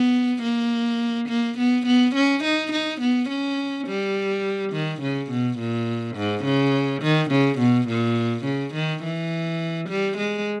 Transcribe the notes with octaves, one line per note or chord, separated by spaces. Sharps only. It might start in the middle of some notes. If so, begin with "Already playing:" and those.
Already playing: B3
A#3
A#3
B3
B3
C#4
D#4
D#4
B3
C#4
G3
D#3
C#3
B2
A#2
G#2
C#3
D#3
C#3
B2
A#2
C#3
D#3
E3
G3
G#3